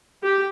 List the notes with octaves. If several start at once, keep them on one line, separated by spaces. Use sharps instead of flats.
G4